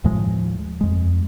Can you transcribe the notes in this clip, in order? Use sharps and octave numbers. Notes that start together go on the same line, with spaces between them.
D#2 A2 F3 G#3
F2 G#3